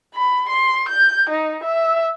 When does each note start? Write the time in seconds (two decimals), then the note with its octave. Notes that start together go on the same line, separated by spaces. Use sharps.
0.14 B5
0.49 C6
0.89 G6
1.30 D#4
1.64 E5